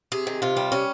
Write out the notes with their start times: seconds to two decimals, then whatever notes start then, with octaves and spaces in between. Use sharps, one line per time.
0.12 C3 G#4
0.27 D#3
0.42 C3 F4
0.57 G3
0.72 C3 C#4